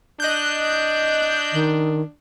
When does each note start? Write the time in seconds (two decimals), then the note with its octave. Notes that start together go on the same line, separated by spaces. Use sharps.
0.20 D4 D#5 F#6 G6
1.53 D#3